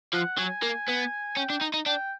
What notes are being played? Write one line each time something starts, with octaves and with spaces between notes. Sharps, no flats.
F3 F#5
F#3 G#5
A#3
B3
C#4 G5
D4
D#4
D#4
D4 G5